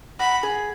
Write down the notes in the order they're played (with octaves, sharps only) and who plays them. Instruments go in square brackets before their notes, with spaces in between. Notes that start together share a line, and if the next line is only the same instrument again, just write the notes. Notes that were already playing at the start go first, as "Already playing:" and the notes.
[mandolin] F#4 [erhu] B5
[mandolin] G#4